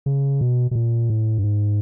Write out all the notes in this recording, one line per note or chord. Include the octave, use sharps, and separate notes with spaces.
C#3
B2
B2
A#2
A2
G2
G#2